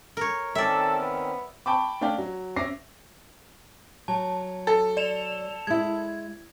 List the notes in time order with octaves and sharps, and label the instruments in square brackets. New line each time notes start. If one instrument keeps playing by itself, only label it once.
[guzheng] A#4 C#5
[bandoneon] D#3 C4 C#4 [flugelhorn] A4 [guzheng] D5 E5
[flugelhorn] B3
[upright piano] G5 A5 B5 C#6 D6
A3 C#4 D4 D5 F5 G5
F#3
C#4 E5 D6 A#6 C7
[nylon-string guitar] F#3 [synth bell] A5
[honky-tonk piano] A4
[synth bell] D5 E7 F7
[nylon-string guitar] G#3 E4 [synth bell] G#6